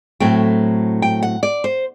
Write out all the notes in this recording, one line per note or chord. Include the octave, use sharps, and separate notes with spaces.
A2 F#3 A3 C4 G5
G5
F#5
D5
C5